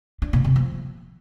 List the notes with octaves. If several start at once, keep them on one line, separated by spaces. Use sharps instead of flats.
D4
B2
C3
F3